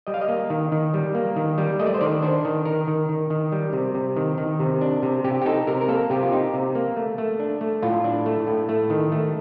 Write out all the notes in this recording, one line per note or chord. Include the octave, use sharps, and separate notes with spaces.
G3 D#5
F5
D#5
A#3
D#3
D#3
G3
A#3
D#3
G3
A3 D#5
D5
C5
D#3 D5
D4 C5
D#3
D#3 A#4
D#3
D#3
D#3
G3
C3
C3
D#3
D#3
C3
D4
C3
C3 G4
G4
D#4 A4
C3 A#4
A#4
A#3 A4
C3 G4
F4
D#4 G4
C3
A#3
A3
A3
D4
A3
A2 F4
D4
A3
A2
A3
D#3
A3